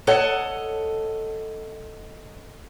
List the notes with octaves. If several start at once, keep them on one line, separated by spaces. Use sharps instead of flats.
A4 C#5 D#5 F#5 A5